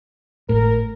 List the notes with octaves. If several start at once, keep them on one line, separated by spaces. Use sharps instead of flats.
G#1 A2 A#4